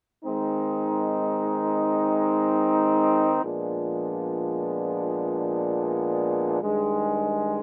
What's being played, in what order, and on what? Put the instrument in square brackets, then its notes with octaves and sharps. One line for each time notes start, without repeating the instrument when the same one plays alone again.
[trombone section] D#3 G#3 C4 D#4
A#2 F3 G#3 B3 D4
G2 D#3 G#3